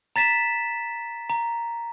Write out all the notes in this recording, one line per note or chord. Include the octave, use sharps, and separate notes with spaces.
A#5 A6 B6 E7
A#5